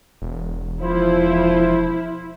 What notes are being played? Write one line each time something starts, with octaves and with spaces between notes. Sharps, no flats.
E1
F3 E4 C5